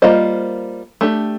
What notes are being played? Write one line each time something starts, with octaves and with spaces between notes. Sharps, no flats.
G3 A#3 F4 C5 D#5
A3 D4 G4